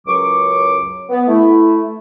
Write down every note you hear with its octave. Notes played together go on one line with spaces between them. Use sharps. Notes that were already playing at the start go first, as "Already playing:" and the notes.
C#2 F#2 F#3 C#6 D6
B3
A3 E4